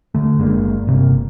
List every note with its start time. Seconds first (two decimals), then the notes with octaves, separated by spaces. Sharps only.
0.14 D3 A3
0.38 F#1 G#3 A#3 D4
0.87 G1 C3 A#3